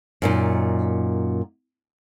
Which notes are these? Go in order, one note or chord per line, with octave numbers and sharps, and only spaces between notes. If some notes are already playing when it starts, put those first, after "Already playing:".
F#2 A#2 D#4